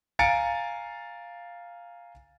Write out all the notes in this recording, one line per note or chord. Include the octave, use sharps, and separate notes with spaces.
F5 G#5 A#5 A6 C#7 D7